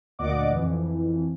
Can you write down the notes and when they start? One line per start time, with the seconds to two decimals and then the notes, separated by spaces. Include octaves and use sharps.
0.19 D2 A#2 D5 D#5 F#5 D6
0.51 F2 E3